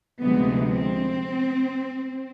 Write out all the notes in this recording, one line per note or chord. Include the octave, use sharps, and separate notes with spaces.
D2 C3 F3 G#3 B3
C4